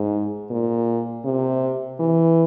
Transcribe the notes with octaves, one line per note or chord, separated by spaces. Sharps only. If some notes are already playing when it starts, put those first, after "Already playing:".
Already playing: G#2
A#2
C3
E3